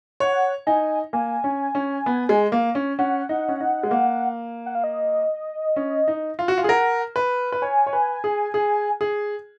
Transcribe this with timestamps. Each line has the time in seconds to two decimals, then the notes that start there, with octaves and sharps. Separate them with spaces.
0.20 C#5 F#5
0.67 D#4 G#5
1.13 A#3 G#5
1.44 C#4
1.75 C#4
2.06 B3
2.29 G#3
2.52 A#3
2.75 C#4
2.99 C#4 F#5
3.29 D#4
3.48 C#4
3.60 D#4
3.83 G#3
3.91 A#3
4.66 F#5
4.75 F5
4.84 D#5
5.76 C#4
6.08 D#4
6.39 F4
6.48 F#4
6.58 F4
6.62 G#4 G#5
6.69 A#4 F#5
7.16 B4
7.52 B4
7.62 C#5 G#5
7.87 C#5
7.93 B4
8.24 G#4
8.54 G#4
9.01 G#4